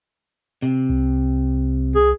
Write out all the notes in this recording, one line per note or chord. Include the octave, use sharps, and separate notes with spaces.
C3
C2
G#4